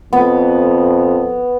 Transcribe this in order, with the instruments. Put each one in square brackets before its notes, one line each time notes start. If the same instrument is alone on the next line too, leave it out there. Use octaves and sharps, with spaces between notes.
[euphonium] F2 [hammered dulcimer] B3